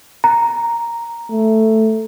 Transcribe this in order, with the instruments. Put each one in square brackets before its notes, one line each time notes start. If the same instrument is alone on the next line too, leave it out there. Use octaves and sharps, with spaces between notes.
[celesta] A#5
[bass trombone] A3